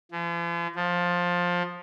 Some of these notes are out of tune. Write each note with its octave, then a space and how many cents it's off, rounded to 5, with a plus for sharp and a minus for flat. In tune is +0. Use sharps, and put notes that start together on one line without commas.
F3 -45
F3 +15